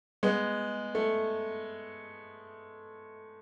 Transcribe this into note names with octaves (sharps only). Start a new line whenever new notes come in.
G#3 B3
A3